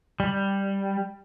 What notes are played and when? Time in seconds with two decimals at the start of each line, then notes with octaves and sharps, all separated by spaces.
0.20 G3